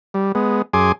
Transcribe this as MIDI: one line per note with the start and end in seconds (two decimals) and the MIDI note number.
0.14 0.32 55
0.35 0.62 56
0.35 0.62 59
0.73 0.92 42
0.73 0.92 68
0.73 0.92 80
0.73 0.92 84
0.73 0.92 86